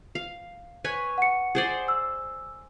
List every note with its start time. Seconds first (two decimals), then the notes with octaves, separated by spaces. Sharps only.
0.15 F5
0.85 B4 C#5 G#5
1.18 F#5 C#7
1.55 G#4 C5 D5
1.88 E6